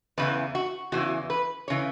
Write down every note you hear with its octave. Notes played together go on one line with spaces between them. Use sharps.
E2 C#3 E3 B4
F#4
E2 C#3 E3 F#4
B4
C#3 E3 C#5